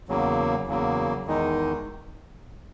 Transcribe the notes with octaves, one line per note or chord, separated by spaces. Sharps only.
E2 C#3 F#3 A#3
E2 C#3 F#3 A#3
E2 D#3 G#3 D#4